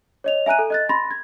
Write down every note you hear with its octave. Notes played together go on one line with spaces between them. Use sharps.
C#5 D#5 F7
E5 G#5 A#5 F#6 D#7
A4
D#5 F#6 A6
B5 C6 A6 A#6
G#6